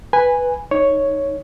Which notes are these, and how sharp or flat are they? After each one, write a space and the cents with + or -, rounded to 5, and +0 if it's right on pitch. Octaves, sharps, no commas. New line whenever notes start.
B4 +0 G#5 -10
D#4 +0 C#5 +0